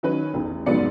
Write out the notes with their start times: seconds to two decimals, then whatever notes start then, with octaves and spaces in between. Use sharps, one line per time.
0.03 D#3 F#3 C#4 D#4 B4
0.34 A1 E2
0.66 F1 G#2 F#3 B3 D5 C#7